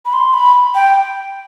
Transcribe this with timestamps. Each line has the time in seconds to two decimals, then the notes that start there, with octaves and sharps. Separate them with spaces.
0.06 B5
0.13 C6
0.34 B5
0.75 G5